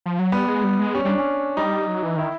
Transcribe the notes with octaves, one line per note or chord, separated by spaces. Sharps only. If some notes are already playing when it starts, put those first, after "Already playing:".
F3
F#3
G3 B3
G#3
G3
G#3
G3 C#4
G3 D4
C#4
G3 D#4
F#3
E3
D#3 E4